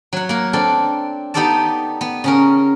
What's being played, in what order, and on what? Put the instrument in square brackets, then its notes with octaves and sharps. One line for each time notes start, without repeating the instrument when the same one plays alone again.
[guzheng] F#3 F#5
A#3 A#4
C4 D4 A4 D5
B3 D#4 G4 A4 D5 A5
B3
C#3 C#4 A#4